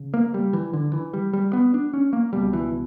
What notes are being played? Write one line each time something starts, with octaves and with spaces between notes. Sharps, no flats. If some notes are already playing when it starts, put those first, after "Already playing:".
Already playing: C#3
A#3
G3
E3
D3
E3
G3
G3
B3
D4
C#4
A#3
C#2 B2 G3
E3